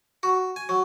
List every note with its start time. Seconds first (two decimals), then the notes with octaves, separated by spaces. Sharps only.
0.23 F#4
0.56 G#5
0.69 F#3